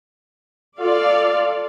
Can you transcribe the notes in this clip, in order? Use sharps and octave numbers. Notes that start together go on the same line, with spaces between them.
F4 A4 D5 F5